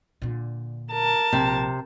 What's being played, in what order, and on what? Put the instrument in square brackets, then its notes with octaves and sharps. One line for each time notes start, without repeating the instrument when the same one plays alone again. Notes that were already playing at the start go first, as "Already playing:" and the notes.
[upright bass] A#2 D3
[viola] A#4 A5
[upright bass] A#1 [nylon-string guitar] C3